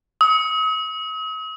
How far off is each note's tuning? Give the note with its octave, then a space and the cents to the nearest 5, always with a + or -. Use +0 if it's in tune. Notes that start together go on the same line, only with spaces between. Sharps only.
D#6 +40